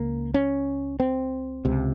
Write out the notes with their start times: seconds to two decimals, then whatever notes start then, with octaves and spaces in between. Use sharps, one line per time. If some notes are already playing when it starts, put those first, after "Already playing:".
Already playing: C#2 C#3 A#3
0.34 C#4
1.00 C4
1.65 C#2 C3